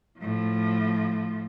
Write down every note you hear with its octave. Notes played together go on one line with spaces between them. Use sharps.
A2 F3